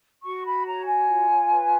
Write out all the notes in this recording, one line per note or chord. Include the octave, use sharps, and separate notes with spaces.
F#4 C#6
B5
C#5 A#5
G#5
F4
B4